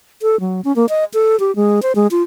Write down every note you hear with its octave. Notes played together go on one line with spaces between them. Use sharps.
A4
F#3
C#4
A#3
D#5
A4
G4
G#3
C5
G#3
F4